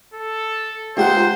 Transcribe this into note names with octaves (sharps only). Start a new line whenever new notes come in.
A4
C#2 D#4 F4 G4 A#4 C5 F#5